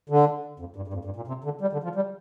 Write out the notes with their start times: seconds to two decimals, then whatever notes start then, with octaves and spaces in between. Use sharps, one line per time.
0.10 D3
0.60 F2
0.76 G2
0.88 G2
0.94 F2
1.05 G2
1.16 A#2
1.28 C3
1.44 D3
1.61 G3
1.73 D3
1.84 F3
1.95 G3